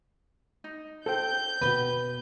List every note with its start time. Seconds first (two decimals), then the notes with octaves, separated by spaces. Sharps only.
0.64 D#4
1.06 A4 C5 G5 G6
1.61 D2 B2 B4